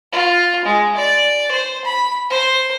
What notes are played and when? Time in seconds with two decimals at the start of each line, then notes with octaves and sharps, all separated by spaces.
0.13 F4
0.65 G#3
0.97 D5
1.52 C5
1.85 B5
2.30 C5